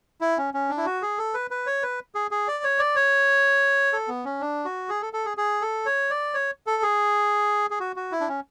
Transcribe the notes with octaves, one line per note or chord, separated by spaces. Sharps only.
E4
C#4
C#4
D4
E4
F#4
G#4
A4
B4
B4
C#5
B4
G#4
G#4
D5
C#5
D5
C#5
A4
B3
C#4
D4
F#4
G#4
A4
A4
G#4
G#4
A4
C#5
D5
C#5
A4
G#4
G#4
F#4
F#4
E4
D4
C#4